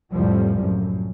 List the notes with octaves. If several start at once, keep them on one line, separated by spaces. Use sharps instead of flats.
C2 F2 A2 C3 F3 G3
F#2 A2